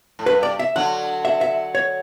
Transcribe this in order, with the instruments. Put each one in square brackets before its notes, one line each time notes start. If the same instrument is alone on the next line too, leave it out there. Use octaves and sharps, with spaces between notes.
[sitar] A2
[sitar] G2 [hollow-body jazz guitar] B4
[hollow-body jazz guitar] D5
E5
[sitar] D3 F#3 [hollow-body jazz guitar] F#5
[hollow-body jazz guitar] E5
E5
C#5